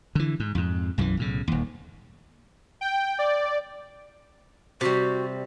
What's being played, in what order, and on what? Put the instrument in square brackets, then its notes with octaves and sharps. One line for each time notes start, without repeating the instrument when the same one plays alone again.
[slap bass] D3 E3
G#2
F2 G#2
B1 F#2 D3 E3
B1 A2 C#3
D#1 D#2
[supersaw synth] G5
D5
[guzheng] C3 G3 [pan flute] F#4